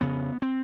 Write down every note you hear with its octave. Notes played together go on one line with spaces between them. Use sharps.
F2 C#3 B3
C4